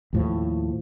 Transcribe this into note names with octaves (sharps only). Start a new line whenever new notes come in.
D#2 A2 F3